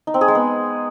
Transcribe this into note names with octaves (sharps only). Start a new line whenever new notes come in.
D#4
C4
G#4
G#3
B3